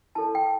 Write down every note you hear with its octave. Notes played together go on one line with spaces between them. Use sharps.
E4 A4 C#5 A5
G5